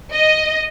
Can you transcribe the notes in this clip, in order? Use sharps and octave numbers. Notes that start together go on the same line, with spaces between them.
D#5